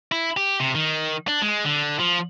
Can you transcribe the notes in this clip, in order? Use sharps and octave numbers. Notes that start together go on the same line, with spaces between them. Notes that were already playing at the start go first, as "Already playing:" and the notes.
E4
G4
C3
D#3
D4
G#3
D3
F3